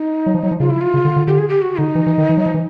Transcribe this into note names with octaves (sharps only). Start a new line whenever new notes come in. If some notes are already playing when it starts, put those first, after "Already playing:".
Already playing: D#4
F#3
F3
F#3
F3
C#3 F4
E4
F4
C#3
D3
D3
D3 G4
G#4
G4
F#4
D3 D#4
E3
E3
D#3
E3
F#3
F3
E3